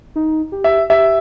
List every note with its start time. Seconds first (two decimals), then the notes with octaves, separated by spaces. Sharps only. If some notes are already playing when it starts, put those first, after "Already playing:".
0.16 D#4
0.52 G4
0.64 E5
0.90 G4 E5